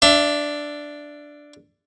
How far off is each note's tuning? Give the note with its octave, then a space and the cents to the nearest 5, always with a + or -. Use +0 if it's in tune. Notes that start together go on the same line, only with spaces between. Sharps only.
D4 +0 E5 +30